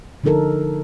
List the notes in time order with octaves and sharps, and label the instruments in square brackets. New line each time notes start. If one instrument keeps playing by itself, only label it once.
[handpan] D3 F3 D#4 A4 A#4